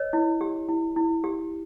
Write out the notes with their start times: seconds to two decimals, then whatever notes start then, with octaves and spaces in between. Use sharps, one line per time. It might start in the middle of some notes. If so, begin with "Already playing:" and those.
Already playing: B4 C#5 D#5
0.13 E4
0.41 G4
0.68 E4
0.96 E4
1.24 G4